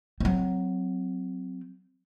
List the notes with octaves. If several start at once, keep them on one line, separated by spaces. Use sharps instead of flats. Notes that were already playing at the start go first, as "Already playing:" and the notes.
F#3 C4